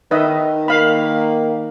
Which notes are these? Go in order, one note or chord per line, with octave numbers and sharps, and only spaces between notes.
D#3 B4 D#5 E5
A#3 F5 B5